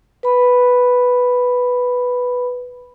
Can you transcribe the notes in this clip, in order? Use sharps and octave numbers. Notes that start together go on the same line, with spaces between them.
B4 B5